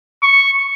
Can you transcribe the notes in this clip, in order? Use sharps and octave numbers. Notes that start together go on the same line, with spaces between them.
C#6